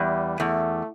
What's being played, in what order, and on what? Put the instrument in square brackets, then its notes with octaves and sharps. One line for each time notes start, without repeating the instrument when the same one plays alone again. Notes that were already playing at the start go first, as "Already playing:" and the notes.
Already playing: [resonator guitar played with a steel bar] E2 [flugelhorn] G3
[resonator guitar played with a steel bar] E2 [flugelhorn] A3